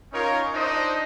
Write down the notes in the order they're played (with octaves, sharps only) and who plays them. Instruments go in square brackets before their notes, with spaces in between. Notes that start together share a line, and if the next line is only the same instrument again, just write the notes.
[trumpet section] C#4 D#4 F4 A#4 C#5
D4 D#4 C5 D#5